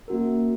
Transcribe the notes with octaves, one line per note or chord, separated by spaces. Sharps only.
A#3 C#4 F#4 A#4